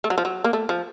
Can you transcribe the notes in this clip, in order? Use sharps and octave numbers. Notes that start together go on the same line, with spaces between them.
A3
F#3
F3
F#3
A#3
A3
F3